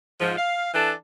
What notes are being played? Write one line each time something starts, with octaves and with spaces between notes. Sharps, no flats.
G#2 F3
F5
E3 D4 A4